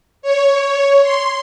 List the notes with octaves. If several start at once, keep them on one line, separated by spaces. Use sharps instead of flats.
C#5
C6